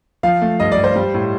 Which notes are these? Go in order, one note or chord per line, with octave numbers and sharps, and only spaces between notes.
F3 F5
A3
G2 D#5
D5
G2
C5
G3
A2